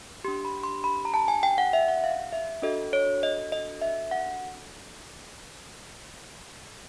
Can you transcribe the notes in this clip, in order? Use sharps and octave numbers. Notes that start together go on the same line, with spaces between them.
D4 G4 C6
B5
C6
B5
A#5
A5
G#5
G5
F#5
E5
F#5
F5
E5
D4 F#4 A4 D#5
C#5
D#5
D#5
E5
F#5